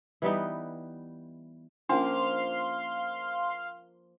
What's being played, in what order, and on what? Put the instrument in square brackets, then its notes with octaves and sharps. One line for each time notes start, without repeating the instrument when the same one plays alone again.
[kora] E3 G3 B3 D#4
[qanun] F3 A#3 [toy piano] C#4 D4 [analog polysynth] F5 [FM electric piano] C6